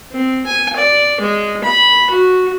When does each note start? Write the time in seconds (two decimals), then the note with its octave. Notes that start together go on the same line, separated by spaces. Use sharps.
0.12 C4
0.46 G#5
0.77 D5
1.20 G#3
1.64 B5
2.10 F#4